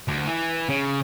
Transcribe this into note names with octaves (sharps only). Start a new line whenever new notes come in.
D2
E3
C#3